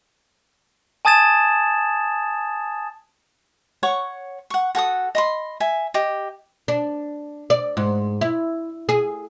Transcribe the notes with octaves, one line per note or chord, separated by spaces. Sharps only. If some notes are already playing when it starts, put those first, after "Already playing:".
G#5 A5 D#6 G#6 A6 E7
C#5 F#5 C#6
F#5 C#6
F#4 A4 F#5 D#6
D#5 B5 C6
E5 G#5
G4 D#5
D4
D5
G#2
E4
G#4